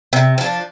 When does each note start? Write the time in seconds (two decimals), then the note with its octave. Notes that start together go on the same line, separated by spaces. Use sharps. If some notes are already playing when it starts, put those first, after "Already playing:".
0.13 C3
0.38 F3 D4